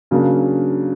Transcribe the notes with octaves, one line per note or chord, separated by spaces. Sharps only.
C#3 F#3 A#3 D4